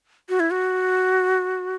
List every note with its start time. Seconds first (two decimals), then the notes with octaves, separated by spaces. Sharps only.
0.29 F#4
0.40 E4
0.51 F#4